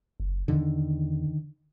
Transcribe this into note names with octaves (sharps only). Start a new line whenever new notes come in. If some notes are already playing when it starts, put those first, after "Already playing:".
F#1
E2 D3 D#3